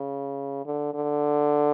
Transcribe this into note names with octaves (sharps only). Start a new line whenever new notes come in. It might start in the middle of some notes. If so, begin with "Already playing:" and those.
Already playing: C#3
D3
D3